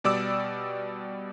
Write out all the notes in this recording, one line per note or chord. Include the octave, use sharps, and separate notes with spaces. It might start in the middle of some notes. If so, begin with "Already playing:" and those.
B2 G3 D5 D6 E6